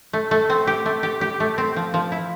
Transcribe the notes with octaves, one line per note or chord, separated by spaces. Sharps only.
A3
A3
C4
G4
A3
G4
G4
A3
C4
F3
F3
E4